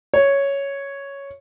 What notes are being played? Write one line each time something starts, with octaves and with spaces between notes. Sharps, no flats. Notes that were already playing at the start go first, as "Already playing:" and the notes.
C#5